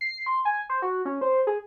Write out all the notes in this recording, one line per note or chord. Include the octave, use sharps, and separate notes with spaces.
C7
C6
G#5
C5
F#4
C#4
C5
G#4